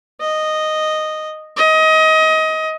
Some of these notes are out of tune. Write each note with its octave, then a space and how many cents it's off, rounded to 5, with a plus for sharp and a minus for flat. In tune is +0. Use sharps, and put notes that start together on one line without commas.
D#5 -5
D#5 +25